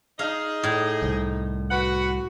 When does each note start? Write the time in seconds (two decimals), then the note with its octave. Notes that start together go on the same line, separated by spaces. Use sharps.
0.19 D#4 G#4 D#5 F5
0.64 A2
1.02 C2
1.71 F#4 B4 F#5